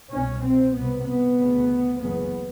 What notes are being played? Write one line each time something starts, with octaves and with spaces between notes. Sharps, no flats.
C2 B2 C#4
C4
C2 C3 B3
B3
D2 C#3
F#1 E2 C#3 B3